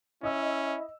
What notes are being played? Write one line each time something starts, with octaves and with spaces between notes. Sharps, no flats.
C#4 E4 D#5 E6